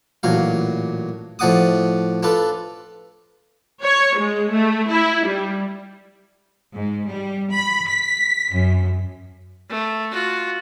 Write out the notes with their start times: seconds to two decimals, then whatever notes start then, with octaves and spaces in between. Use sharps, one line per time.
0.23 A1 A#2 F#3 F5
1.39 A2 F3 D5 F#5 D6 D#6
2.23 D4 F4 A4 B4
3.85 C#5
4.19 G#3
4.52 A3
4.91 E4
5.27 G3
6.75 G#2
7.09 G3
7.54 B5
7.88 B6
8.53 F#2
9.69 A3
10.11 F4 F#4